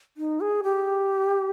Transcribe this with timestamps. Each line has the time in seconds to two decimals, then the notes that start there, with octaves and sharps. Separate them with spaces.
0.17 D#4
0.40 G#4
0.63 G4